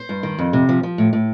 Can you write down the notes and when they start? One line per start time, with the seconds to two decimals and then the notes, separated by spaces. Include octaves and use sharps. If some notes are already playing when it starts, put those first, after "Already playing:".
Already playing: C5
0.09 G2
0.23 D#3
0.38 F2
0.53 C3
0.69 F3
0.83 F3
0.98 A2
1.13 A2